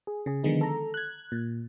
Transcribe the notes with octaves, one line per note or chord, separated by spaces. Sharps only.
G#4
C#3 G#4
D3 D#3 F3 G#3 B3 D#4
A4 A#5
F#6 G#6
A#2